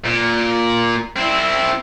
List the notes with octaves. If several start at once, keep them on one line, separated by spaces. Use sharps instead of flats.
A#2
C4 E4